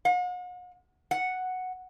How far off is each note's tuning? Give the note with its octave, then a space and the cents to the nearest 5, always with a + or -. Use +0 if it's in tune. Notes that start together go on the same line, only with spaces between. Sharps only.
F#5 -45
F#5 +0